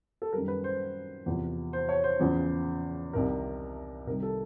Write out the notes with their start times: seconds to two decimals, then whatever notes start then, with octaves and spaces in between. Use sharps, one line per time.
0.22 A4
0.33 F#2 D#3 G3 A#4
0.48 B4
0.64 C5
1.26 E2 C3 F3
1.73 C5
1.89 C#5
2.04 C5
2.20 E2 C#3 F3
3.13 C2 C3 D#3 A#4
4.07 C3 D#3 G3 A#4
4.23 A4